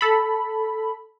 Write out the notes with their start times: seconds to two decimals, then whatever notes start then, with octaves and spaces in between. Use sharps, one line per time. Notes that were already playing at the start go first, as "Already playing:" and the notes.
0.01 A4 B5